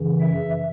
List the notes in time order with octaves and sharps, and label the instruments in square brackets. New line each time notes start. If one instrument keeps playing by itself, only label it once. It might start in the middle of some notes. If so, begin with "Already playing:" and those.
Already playing: [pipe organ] F#2 C#3 E3
E5